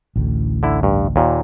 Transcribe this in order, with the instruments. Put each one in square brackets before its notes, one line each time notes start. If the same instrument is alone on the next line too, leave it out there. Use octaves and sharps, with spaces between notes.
[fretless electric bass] A1 D2 A2
[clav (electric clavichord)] D3 E4
G2
D#2 A#2